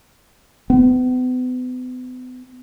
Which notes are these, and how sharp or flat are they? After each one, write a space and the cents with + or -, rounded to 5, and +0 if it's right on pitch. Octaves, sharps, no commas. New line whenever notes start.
B3 +40